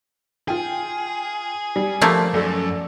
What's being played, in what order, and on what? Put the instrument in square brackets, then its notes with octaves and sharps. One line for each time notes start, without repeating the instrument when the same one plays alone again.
[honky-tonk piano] F4 G5 [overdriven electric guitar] G#4
[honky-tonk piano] G3
[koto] F3 A3 A#3
[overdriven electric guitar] F#2 [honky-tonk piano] A4 D5